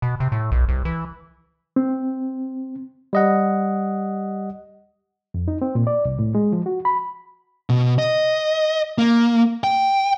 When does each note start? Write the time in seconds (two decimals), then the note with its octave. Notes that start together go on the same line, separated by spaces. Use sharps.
0.02 B2
0.20 C3
0.32 A2
0.52 B1
0.69 C2
0.85 E3
1.76 C4
3.13 G3 D#5 F#5
5.34 F2
5.48 D#4
5.62 C4
5.75 A#2
5.87 D5
6.05 C2
6.19 A2
6.35 G#3
6.53 F3
6.66 F#4
6.85 B5
7.69 B2
7.99 D#5
8.98 A#3
9.64 G5